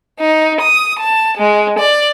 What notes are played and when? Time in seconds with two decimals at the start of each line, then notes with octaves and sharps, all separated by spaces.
0.19 D#4
0.61 D#6
0.99 A5
1.38 G#3
1.78 D5